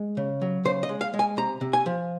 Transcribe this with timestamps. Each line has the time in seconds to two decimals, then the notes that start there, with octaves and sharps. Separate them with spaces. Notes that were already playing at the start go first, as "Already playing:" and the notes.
Already playing: G#3
0.17 C#3
0.42 F#3
0.65 C#3 C5
0.83 D#5
0.89 G#3
1.01 F5
1.14 G#3
1.19 G#5
1.37 C3 A#5
1.61 C3
1.73 G#5
1.86 F3